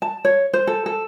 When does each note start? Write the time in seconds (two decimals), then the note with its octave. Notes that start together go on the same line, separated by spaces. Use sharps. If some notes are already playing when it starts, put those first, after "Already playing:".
0.02 A5
0.25 C#5
0.53 C5
0.67 A4
0.86 A4